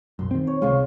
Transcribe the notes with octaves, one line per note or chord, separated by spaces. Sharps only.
B1 F#2 C6
D#3 C4
C#5
C#2 C3 G#3 F4 C5 C#6